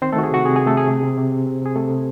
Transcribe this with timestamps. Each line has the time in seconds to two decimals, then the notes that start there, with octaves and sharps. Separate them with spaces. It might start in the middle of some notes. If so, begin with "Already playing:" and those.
0.02 D#3 C4 C5
0.13 A3 A4
0.16 D#3 F#4
0.23 G#4
0.31 C3 F#4
0.45 C3 G#4
0.56 G#4
0.60 C3
0.67 A3 A4
0.74 C3 G#4
0.88 C3
1.03 C3
1.17 C3
1.32 C3
1.47 C3
1.61 C3 G#4
1.76 C3 A3 A4
1.91 C3